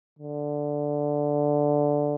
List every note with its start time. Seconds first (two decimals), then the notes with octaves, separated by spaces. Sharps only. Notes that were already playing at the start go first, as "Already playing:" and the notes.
0.19 D3